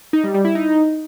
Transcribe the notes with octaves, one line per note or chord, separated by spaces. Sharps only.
D#4
G3
G3
E4
D#4